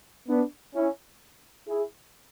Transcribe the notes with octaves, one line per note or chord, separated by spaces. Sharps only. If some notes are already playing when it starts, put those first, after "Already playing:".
B3 D4
C#4 E4
E4 G#4